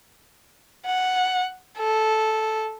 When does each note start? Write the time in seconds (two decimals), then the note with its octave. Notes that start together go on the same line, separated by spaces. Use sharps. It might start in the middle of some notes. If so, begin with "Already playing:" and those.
0.86 F#5
1.78 A4